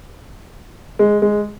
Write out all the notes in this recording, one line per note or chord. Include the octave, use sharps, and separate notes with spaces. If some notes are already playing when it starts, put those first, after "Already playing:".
G#3
G#3